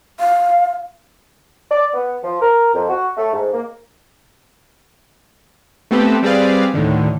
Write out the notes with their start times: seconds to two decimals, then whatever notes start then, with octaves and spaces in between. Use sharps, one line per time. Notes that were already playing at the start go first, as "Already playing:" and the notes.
0.20 F5
1.70 D5
1.94 B3
2.23 F3
2.41 A#4
2.74 F2
2.89 F#4
3.17 A3
3.33 G#2
3.53 A#3
5.91 A3 B3 C4 G4 A4 B4
6.23 G3 C4 G#4 B4 D5 F5
6.74 D2 A2 D3 D#3